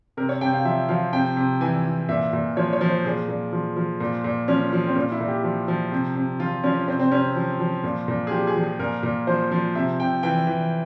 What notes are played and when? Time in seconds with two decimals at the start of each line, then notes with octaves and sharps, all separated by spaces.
0.17 C3 A#4
0.29 C#5
0.41 C3 G5
0.53 F5
0.65 F3 E5
0.89 F3 F5
1.13 C3 G5
1.37 C3
1.61 E3 G#5
1.85 E3
2.09 A#2 E5
2.33 A#2
2.57 F3 C#5
2.73 C#5
2.81 F3
2.88 C5
3.05 A#2 G#4
3.28 A#2
3.53 F3
3.76 F3
4.00 A#2
4.24 A#2
4.48 F3 C#4
4.73 F3
4.87 C4
4.96 A#2 C#4
5.12 E4
5.20 A#2
5.28 G4
5.44 F3
5.68 F3
5.92 C3
6.16 C3
6.40 F3 F4
6.64 F3 C#4
6.88 C3 C4
6.99 C4
7.12 C3 C#4
7.36 F3
7.60 F3
7.84 A#2
8.08 A#2
8.27 G#4
8.31 F3 G4
8.47 G#4
8.56 F3
8.63 G#4
8.80 A#2 A#4
9.03 A#2
9.27 F3 C5
9.51 F3
9.75 C3 E5
10.00 C3 G5
10.23 E3 G5
10.47 E3